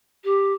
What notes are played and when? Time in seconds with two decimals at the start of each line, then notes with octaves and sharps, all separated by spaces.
0.24 G4